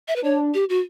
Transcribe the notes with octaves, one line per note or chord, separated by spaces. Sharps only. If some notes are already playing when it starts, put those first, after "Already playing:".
E5
B4
D4 C#5
G4
F#4